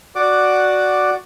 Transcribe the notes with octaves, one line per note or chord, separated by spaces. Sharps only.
F#4 D5 F#5 D6